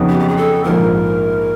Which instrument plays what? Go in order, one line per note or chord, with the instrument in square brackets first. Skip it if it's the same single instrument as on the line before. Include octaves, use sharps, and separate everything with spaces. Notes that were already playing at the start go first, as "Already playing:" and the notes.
Already playing: [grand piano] F2 C#3 F#3 B3 D#4
[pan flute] G4
G4
G#4
A4
[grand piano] A#1 G#2 F3 A#3 [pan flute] A#4